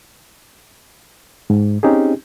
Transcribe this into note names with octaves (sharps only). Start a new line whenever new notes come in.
G#2
C4 C#4 D#4 G4 G#4